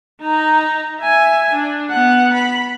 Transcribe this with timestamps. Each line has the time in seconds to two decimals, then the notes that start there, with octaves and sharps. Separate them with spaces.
0.21 D#4 A#5
1.00 E5 G#5
1.53 D4
1.90 B3 F#5
2.34 B5